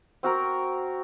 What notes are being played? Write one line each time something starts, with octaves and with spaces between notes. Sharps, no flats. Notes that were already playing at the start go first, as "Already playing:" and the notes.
C4 F#4 A#4